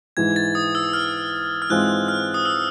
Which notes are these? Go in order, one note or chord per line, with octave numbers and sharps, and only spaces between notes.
G#2 E3 G#3 G#6
A6
D#6
E6
F6
F6
G#2 E3 G#3 C4 F4 F#6
F6
D#6
E6